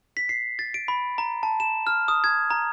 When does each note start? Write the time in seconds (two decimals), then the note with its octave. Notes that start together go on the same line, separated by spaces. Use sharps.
0.17 B6
0.29 C7
0.59 A6
0.74 D7
0.88 B5
1.18 A#5
1.43 A5
1.60 E7
1.87 F6
2.08 D#6
2.24 G#6
2.50 A#5